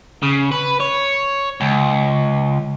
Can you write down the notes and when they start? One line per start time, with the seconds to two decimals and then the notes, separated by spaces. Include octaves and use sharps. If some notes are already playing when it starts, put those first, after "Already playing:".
0.22 C#3
0.51 B4
0.80 C#5
1.61 C#2